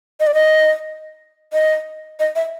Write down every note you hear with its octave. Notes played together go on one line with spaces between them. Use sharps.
D#5
D5
D#5
D#5
D#5
E5